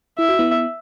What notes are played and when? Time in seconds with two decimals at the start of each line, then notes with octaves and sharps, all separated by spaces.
0.19 E4 E5
0.29 F#4
0.39 B3 E4